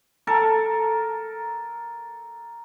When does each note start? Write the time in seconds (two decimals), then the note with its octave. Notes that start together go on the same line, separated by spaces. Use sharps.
0.27 A4 A#4